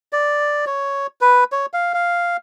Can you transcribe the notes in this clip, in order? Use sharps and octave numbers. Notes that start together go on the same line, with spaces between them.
D5
C#5
B4
C#5
F5
F5